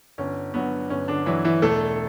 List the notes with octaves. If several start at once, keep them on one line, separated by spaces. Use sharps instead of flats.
G1 C#4
G2 F#3 B3
G1 C#4
D3 D4
G2 E3 F#3 E4
E3 E4
E1 A3 A4